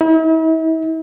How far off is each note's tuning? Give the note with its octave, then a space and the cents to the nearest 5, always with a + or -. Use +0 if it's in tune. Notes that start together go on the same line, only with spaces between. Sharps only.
E4 -45